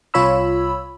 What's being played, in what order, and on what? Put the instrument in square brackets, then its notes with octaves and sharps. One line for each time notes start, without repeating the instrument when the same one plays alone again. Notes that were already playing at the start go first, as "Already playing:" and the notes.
[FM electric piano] C2 F4 C#5 B5 E6